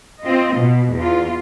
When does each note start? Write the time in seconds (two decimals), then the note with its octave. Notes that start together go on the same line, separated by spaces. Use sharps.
0.22 C4 F4 D#5
0.59 B2
0.95 E2 F4